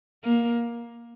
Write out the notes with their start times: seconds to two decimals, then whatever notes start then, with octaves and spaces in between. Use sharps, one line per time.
0.24 A#3